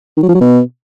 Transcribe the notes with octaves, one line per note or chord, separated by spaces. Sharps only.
D#3
F#3
F3
F#3
B2